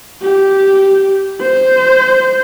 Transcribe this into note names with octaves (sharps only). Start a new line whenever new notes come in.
G4
C5